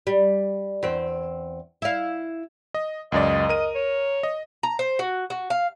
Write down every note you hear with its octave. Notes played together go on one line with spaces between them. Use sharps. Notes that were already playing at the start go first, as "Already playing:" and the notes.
G3
E2 C4
E4 F5
D#5
C#2 F#2 D5 D#5
A#4 D#7
C#5
D#5
A#5
C5
F#4
F#4
F5